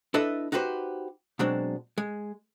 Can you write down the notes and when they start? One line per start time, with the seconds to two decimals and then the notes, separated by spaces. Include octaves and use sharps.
0.14 D4 E4 A4 B4 D#5 E5
0.52 D#4 F#4 G4 B4 C5
1.39 B2 F#3 G#3 C4 D4
1.98 G#3